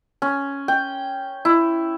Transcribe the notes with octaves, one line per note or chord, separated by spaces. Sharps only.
C#4
G5
E4